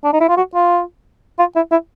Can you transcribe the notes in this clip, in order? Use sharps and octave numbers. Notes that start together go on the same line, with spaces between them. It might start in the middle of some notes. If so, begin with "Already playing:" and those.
D4
D#4
E4
F4
F#4
F4
F4
E4
E4